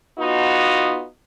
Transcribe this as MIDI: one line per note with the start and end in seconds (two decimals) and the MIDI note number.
0.19 1.06 59
0.19 1.06 63
0.19 1.06 65
0.19 1.06 66